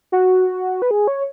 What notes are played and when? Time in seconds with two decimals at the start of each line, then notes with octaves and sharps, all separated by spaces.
0.12 F#4
0.82 B4
0.91 G#4
1.08 C#5